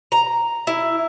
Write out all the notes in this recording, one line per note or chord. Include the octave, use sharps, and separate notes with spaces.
A#5
E4